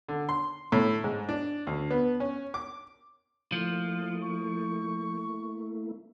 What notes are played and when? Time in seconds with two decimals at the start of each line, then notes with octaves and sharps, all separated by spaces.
0.09 D3
0.29 C6
0.72 A2
1.04 G#2
1.29 D4
1.67 D2
1.91 B3
2.20 C#4
2.54 D6
3.52 F3 A3 A#3 E4 F5
4.23 C#6